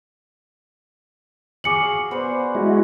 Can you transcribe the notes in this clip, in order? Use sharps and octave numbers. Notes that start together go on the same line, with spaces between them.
F#4 G#4 F5 D6 C#7 F#7
B3 C5 D5
G#3 E4 F#4